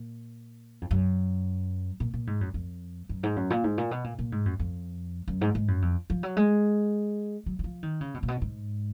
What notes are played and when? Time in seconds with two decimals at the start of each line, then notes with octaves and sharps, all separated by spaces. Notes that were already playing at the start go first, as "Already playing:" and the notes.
Already playing: A#2
0.81 F2
0.91 F#2
2.00 A#2
2.14 A#2
2.27 G#2
2.41 F#2
2.54 F2
3.09 F#2
3.23 G#2
3.36 F#2
3.50 A#2
3.64 G#2
3.78 A#2
3.91 B2
4.04 A#2
4.19 A#2
4.32 G#2
4.46 F#2
4.59 F2
5.28 F#2
5.41 G#2
5.55 G#2
5.68 F#2
5.82 F2
6.10 F3
6.23 F#3
6.37 G#3
7.46 F#3
7.59 F#3
7.64 F3
7.83 D#3
8.01 C#3
8.14 B2
8.23 A#2
8.28 B2
8.42 G#2